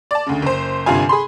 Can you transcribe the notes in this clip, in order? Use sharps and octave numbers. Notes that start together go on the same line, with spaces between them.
D5 A5
D2 C#3
F#1 C5
G1 G2 C3 F4 F5 G#5
G#4 B5 C6